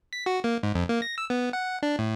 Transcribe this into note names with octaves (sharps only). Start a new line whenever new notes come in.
B6
F#4
A#3
G#2
F2
A#3
A#6
E6
B3
F#5
D4
A2